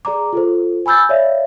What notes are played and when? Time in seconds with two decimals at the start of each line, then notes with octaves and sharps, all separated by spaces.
0.05 G#4 D5 A#5 D6
0.33 F4 A4 C5
0.86 G#5 B5 E6 G6 A6
1.09 C#5 D5 E5 F5